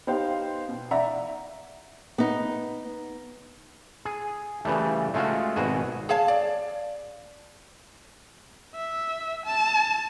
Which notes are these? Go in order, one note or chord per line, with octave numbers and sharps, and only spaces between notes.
B3 D#4 G4 C5 F5 G5
B2
D5 E5 F#5 A#5
B3 D#4
G#4
C#3 E3 G3 A3
G#3 A3 C#4 F4 F#4
G#1 B2 F#4 G#4
G#4 C#5 F5 A5
D5
E5
A5